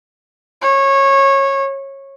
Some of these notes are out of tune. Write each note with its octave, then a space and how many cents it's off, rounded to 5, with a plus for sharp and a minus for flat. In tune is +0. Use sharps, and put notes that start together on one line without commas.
C#5 -20